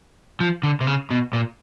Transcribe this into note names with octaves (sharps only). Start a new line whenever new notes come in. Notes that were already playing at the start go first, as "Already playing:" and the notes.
F3
D3
C3
C#3
B2
A#2